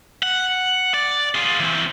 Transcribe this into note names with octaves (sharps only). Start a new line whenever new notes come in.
F#5
D5
F4 G#4
E3 C4